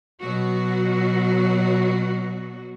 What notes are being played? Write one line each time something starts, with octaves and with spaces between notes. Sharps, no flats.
B2 F#3 F#4